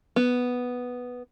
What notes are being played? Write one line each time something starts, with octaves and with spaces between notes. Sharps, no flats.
B3